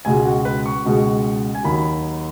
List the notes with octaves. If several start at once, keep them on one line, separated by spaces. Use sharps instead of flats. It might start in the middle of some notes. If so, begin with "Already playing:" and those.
C#2 B2 G#3 G#5
F#4
B4
C#6
C#2 B2 G#3
G#5
D#2 D#3 F#3 B5